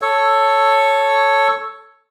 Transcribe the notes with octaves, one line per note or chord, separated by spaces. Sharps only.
A4 C#5